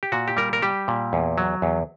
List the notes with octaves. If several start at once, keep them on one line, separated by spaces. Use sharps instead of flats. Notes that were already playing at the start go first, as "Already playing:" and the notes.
G4
A#2 F#4
G4
G3 A#4
A#4
G3 G4
A#2
E2
F#3
E2